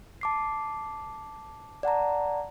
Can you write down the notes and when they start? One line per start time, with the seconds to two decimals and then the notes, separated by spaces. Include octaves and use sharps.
0.21 A5 D6 C7
1.83 D5 F#5 A5 A#5